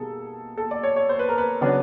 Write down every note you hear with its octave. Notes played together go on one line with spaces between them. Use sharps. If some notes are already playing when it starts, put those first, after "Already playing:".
Already playing: B2 G3 A#3 D#4 G#4 A4
A4
D5
C#5
C#5
C5
B4
A#4
B4
C#3 F#3 B3 D4